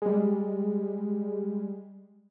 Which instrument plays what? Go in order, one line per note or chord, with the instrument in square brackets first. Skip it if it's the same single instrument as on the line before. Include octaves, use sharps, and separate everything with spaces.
[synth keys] G3 G#3